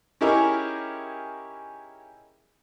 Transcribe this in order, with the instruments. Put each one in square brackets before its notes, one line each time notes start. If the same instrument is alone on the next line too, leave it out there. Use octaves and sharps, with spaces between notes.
[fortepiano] C#4 D#4 E4 G4 G#4 A#4